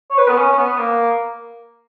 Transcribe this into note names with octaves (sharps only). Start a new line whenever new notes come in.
C#5
B4
B3
C#4
C#4
B3
A#3